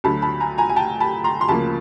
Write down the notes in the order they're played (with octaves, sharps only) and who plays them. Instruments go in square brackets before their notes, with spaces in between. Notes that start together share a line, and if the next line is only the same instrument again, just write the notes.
[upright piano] D2 D3 F#3 A5 B5
A5 B5
G#5 A#5
G#5 A#5
G#5
G5 A5
A5 B5
A#5 C6
C6
D2 C#3 F3 A#3 A5 B5